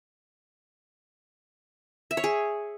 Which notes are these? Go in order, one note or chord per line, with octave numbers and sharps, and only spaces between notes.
E5
C#5
G#4